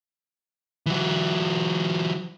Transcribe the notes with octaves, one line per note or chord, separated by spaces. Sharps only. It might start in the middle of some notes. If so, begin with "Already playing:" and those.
E3 F#3